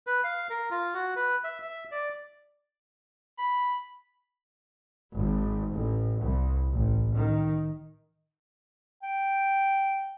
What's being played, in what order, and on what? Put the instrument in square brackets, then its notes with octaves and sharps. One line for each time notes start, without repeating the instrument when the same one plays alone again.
[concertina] B4
F5
A#4
F4
F#4
B4
E5
E5
D5
[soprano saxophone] B5
[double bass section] G#1
A1
C2
A1
D#3
[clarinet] G5